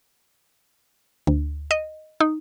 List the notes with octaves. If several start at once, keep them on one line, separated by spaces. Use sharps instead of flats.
D2
D#5
D#4